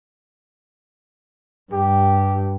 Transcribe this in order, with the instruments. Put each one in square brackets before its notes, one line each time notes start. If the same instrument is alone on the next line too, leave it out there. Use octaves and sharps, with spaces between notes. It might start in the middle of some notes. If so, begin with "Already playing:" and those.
[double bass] G2 [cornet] G4